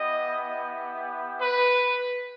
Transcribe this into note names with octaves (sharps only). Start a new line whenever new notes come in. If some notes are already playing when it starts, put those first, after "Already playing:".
Already playing: B3 E4 G4 D#5
B4